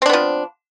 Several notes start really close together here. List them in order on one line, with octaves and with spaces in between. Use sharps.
C4 D4 B3 F3